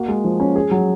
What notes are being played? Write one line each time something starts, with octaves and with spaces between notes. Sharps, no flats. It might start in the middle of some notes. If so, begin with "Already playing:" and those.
Already playing: A#3 F#4
G#3
F3
C#4
G#4
F#3